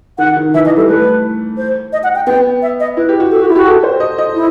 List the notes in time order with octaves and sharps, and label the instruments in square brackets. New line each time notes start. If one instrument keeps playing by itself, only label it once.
[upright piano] D#3 [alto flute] F#5
[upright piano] D#3
[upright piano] E3 [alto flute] E5
[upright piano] E3 [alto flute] D#5
[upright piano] G3 [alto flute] A4
[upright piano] A3 [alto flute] B4
[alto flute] C5
D#5
F#5
G5
[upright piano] B3 [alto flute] G5
[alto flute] E5
D#5
[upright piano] E4 [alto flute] B4
[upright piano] G4
F#4
[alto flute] A4
F#4
E4
[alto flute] F#4 [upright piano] G4
[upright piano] A4
C5
D#5
D#5
[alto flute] E4